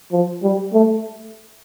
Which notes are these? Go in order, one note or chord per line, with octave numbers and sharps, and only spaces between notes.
F3
G3
A3